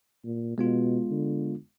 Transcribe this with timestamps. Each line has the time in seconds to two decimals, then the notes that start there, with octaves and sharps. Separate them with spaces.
0.25 A#2
0.58 B2 G#3 B3 F4
1.11 D3